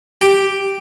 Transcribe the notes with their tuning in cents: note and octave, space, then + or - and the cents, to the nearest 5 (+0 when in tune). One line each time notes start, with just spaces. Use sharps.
G4 +0 G5 +0